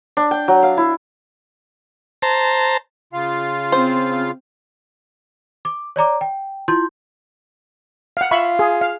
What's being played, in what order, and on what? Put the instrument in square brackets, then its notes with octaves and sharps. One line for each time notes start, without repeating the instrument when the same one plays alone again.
[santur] D4
G5
F#3
F5
E4
[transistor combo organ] C5 A5 A#5
[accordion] C#3 F4 F5
[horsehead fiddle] C4 [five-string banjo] C5
[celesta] D6
C#5 D5 A#5 D6
G5
E4 F4 C6 G6
[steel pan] F5 F#5
[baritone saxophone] F4 [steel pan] E5 B5 C#6
[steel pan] G#4
F5